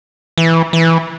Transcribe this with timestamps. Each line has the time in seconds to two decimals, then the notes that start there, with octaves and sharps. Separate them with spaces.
0.38 E3
0.73 E3